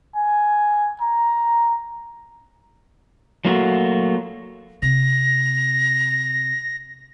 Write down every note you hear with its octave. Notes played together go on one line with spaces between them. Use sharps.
G#5
A#5
F#3 A3 A#3 F4 F#4
C3 A#6